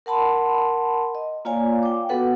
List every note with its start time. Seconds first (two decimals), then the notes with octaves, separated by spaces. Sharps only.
0.06 A#4 F#5 A5 B5 C6
1.15 D#5
1.45 A#3 F4 C#5 D5 F5 G#5
1.83 G5 D6
2.09 B3 F#4 A4 B4 F#5